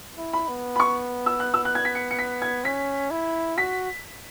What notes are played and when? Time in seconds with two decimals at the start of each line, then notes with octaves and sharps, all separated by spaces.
0.18 E4
0.33 B5
0.48 B3
0.76 B5
0.80 C#6
1.26 E6
1.40 F#6
1.54 E6
1.65 F#6
1.75 G#6
1.85 B6
1.95 C#7
2.11 C#7
2.19 B6
2.42 G#6
2.65 C#4 B6
3.11 E4
3.57 F#4 B6